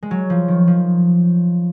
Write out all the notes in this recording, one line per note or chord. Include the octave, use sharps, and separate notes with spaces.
G#3
F#3
F3
D#3
F3